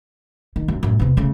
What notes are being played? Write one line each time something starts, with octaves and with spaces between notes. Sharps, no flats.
D#3
F#2
F#2 A2
E2 C3
C#3 A3